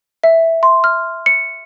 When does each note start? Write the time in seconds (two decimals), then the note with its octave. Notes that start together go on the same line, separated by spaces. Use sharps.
0.23 E5
0.63 C6
0.84 F6
1.26 C#7